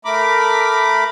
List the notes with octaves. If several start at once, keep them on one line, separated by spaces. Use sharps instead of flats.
A3 A#4 B5 D6